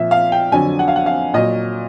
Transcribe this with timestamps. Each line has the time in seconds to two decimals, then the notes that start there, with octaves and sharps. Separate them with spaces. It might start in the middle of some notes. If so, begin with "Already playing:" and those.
Already playing: A#2 F3 E5
0.11 F5
0.32 G5
0.52 F2 D3 F#3 G#5
0.79 F#5
0.88 F5
0.96 F#5
1.06 F5
1.34 A#2 F#3 D#5